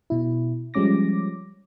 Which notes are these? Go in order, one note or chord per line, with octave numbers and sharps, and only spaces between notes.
B2 E4
F3 G3 G#3 C#4 D6 A#6